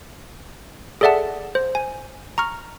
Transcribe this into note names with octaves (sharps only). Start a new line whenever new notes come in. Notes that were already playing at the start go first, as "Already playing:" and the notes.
G#4 A4 D5 E5 F#5 A5
C5
G#5
A#5 C#6 F6